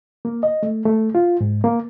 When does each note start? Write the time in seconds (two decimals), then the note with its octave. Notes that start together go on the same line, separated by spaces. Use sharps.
0.25 A#3
0.43 D#5
0.63 A3
0.85 A3
1.15 F4
1.41 G#2
1.64 A#3